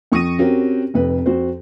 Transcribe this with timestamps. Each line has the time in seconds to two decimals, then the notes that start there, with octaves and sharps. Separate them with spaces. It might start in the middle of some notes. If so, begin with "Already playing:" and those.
0.12 F2 F3 C#6 D#6 A#6 D#7
0.39 C4 C#4 F#4 G4 A#4
0.94 F1 F2 B4
1.26 F2 F#4 C5